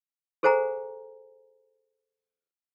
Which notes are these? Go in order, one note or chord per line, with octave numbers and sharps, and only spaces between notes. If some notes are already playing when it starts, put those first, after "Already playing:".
G#4 A4 C5 F#5 G#5 A#5